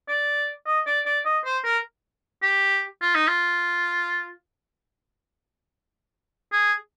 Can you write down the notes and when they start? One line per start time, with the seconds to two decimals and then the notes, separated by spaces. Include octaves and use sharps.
0.08 D5
0.67 D#5
0.87 D5
1.06 D5
1.25 D#5
1.45 C5
1.64 A#4
2.42 G4
3.02 F4
3.15 D#4
3.27 F4
6.52 G#4